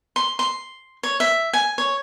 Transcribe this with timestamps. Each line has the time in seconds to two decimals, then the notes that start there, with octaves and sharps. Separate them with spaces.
0.16 C6
0.39 C6
1.03 C#5
1.20 E5
1.53 G#5
1.78 C#5